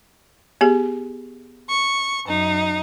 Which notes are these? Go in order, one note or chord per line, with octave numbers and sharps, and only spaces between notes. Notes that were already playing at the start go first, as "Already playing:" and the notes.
B3 G4 G#4
C#6
F#2 D#4